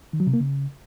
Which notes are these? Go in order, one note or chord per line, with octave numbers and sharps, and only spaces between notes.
D#3
F#3
C3
A#3
C#3